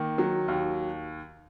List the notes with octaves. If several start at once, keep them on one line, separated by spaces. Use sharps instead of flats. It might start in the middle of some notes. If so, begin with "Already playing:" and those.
Already playing: D#3 A#3
F#3
D#2